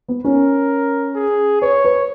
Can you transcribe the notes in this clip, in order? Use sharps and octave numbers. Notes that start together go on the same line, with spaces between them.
B3
C#4 A#4
G#4
B4 C#5
B4